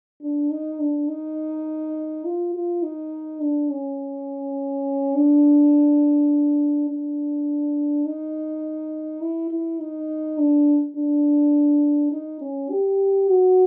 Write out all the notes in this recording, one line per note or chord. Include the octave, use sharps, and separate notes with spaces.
D4
D#4
D4
D#4
F4
F4
D#4
D4
C#4
D4
D4
D#4
E4
E4
D#4
D4
D4
D#4
C#4
G4
F#4